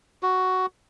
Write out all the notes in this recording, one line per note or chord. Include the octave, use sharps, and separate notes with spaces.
F#4